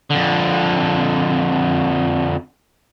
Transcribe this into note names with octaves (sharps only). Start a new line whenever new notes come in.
F2 D3